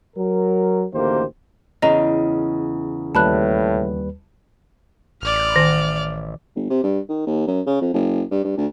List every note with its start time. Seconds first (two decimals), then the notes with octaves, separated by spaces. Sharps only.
0.16 F#3 A#4
0.93 A1 D2 D#3 A#3 G4 C5
1.82 E2 C#3 D#5 A#5
3.15 D#2 A2 G3 B4 A5 B5 F#6
5.22 A1 D5 F6
5.56 D#3
6.56 G1
6.70 C3
6.84 G2
7.09 D#3
7.27 D#2
7.47 F#2
7.67 C#3
7.81 F2
7.94 F#1
8.31 G2
8.45 G2
8.57 D2